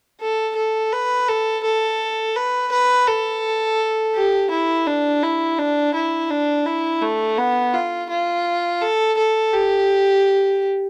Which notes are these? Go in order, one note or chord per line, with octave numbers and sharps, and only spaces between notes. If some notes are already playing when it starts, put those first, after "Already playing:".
A4
A4
B4
A4
A4
B4
B4
A4
G4
E4
D4
E4
D4
E4
D4
E4
A3
B3
F4
F4
A4
A4
G4